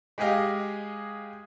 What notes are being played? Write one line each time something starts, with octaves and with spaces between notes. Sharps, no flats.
G#3 G4 G#4 D#5 F5